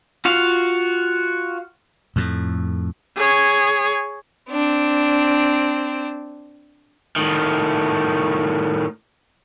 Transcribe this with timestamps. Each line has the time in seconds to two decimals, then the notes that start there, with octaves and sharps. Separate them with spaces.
0.25 F4 F#4 F5
2.16 F2 A2
3.17 G#4 C#5
4.50 C4 D4
7.16 A2 D#3